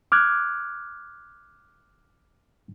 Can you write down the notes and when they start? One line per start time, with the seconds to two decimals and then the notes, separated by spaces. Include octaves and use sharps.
0.12 D6 F6 F#6 G#6